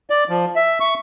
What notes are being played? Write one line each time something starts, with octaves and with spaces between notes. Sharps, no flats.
D5
F3
E5
C#6